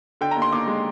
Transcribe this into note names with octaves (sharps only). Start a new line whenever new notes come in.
D3 G5
A#5
D#2
C6
D#2 D6
G#3